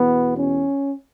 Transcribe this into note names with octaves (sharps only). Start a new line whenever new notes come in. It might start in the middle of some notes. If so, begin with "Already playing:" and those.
Already playing: E2 B2 B3
C#4